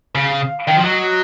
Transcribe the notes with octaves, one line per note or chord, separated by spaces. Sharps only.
C#3 F5
D#3
F3
F#3 D#5